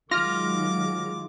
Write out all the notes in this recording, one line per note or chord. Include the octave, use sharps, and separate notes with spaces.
D#3 F#3 G#3 F4 D6 F6 A#6